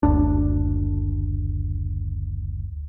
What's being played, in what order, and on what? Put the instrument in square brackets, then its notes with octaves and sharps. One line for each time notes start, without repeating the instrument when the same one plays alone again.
[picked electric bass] F#1 D2 D4